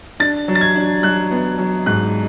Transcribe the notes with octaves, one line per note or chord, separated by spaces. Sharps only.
D4 A6
F#3
A6
G#6
D4
F#3 F#6
B3
F#3
G#2 F#6